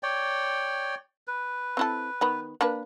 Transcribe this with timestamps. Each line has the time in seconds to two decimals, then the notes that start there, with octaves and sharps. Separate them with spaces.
0.03 C#5 D5 G5
1.27 B4
1.77 C4 E4 A4
2.21 D#3 B3 B5
2.61 A#3 D4 B4